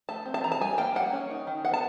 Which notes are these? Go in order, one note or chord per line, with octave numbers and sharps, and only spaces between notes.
A3 A5
C4
A5
E3 A#5
A5
G3 G#5
A#3 G5
A#3 F#5
C#4
D#4
D#3
B3 F#5
A5